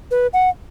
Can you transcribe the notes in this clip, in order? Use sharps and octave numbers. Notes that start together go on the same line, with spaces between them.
B4
F#5